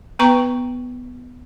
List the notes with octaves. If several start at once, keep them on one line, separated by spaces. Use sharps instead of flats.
B3 B4 G5 A#5 C#6